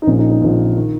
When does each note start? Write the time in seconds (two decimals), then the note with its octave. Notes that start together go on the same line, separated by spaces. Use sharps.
0.02 D#4
0.07 A#1 A#2 C#4
0.19 D#4
0.30 D#4
0.41 A#1 A#2
0.76 D#3